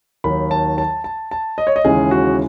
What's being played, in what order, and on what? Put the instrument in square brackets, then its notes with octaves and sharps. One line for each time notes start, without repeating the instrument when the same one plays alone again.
[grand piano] D#2 D#3 F#3 B5
A5
A5
A5
A5
D#5
C#5
D#5
D#2 C#3 E3 G#3 G#4
F#4